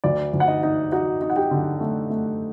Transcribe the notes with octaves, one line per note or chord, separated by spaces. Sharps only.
D2 D5
D2
F#5
D#4 D#5
D#4
D#4 F#4 F#5
D#4
F#5
G4 G5
D3
A3
A3